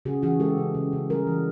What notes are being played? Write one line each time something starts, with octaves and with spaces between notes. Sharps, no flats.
C#3 F#4 G#4
E3 F#4 G#4
G#3 G4 A4
C#3
C#3
C#3
G3 G#4 A#4
E3